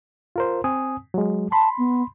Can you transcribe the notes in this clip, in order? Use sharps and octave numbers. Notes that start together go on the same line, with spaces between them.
F4 A#4 C5
C4 G#5 D#6
F#3 G#3
A5 B5 C6
B3